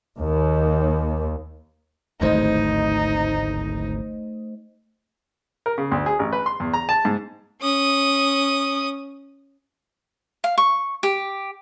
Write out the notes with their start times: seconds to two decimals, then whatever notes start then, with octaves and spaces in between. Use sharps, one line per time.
0.19 D#2
2.21 D1 G#1 E2 A3 D#4 C5 D#5
5.66 A#4
5.78 C#3
5.91 D2
6.06 G#4
6.19 A1
6.32 B4
6.46 C6
6.60 E2
6.74 A#5
6.89 A5
7.05 G#2
7.61 C#4 D#6
10.44 F5
10.58 C#6
11.03 G4